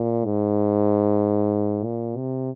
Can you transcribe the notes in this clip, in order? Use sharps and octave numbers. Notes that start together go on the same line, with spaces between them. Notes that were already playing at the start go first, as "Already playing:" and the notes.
Already playing: A#2
G#2
A#2
C3